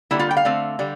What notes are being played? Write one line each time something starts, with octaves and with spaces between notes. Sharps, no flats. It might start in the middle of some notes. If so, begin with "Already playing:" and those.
D3 G3 A#3 E4
F4
G5
F5
D3 A3 C4
D3 G3